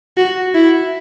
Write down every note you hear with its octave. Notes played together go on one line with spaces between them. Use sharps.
F#4
E4